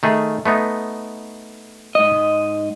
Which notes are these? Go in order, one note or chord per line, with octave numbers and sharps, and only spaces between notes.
D#3 A3 G#4
A3 B3 D#4
G#2 D#5